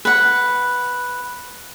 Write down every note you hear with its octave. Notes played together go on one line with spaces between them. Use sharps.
B4 F#5